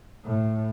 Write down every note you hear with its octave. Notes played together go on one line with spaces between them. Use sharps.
A2